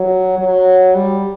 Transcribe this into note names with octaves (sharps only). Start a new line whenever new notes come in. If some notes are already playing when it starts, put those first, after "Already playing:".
Already playing: F#3
F#3
G3